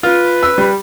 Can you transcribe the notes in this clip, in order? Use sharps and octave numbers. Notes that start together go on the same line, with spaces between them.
F4 B4
E6
G3